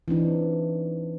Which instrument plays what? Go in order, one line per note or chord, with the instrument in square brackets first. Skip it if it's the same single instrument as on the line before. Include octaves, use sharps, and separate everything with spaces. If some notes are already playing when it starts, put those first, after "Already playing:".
[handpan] E3 C4 D4 D#4